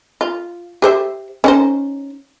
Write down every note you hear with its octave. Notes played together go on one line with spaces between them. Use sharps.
F4
G4 C5 E5
C#4 D#4 C5